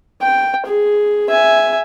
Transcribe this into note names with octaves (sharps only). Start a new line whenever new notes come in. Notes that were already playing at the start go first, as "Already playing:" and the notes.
G5
G#4
E5 G#5